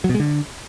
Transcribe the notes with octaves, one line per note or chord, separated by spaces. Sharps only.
F#3
B2
G#3
D3